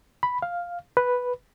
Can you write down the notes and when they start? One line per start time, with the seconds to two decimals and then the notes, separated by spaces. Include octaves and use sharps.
0.23 B5
0.42 F5
0.97 B4